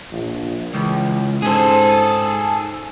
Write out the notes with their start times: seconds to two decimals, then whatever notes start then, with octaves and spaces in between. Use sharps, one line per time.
0.12 A#1
0.74 C#2 E3
1.42 G#2 C4 C#4 G#4 A4